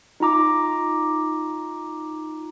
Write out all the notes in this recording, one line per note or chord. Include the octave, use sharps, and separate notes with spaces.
D#4 F4 A#5 D6